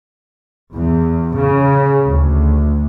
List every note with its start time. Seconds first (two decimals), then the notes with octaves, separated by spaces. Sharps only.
0.75 E2
1.34 C#3
2.07 D2